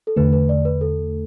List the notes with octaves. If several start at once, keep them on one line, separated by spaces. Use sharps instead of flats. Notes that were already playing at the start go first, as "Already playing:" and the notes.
A4
E2 D3 A3 B4
B4
D5
B4
A4